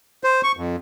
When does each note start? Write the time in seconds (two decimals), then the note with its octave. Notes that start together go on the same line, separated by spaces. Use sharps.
0.24 C5
0.43 C#6
0.57 F2